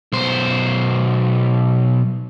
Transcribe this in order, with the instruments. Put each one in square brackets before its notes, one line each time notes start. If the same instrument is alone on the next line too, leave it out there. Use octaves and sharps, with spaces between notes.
[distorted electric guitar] B1 C5